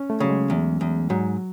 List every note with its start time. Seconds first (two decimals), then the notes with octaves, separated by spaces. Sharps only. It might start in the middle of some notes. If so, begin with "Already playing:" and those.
Already playing: C#4
0.10 A3
0.20 C#3 F#3
0.29 G#3
0.50 E2
0.81 E2
1.10 G#2 F#3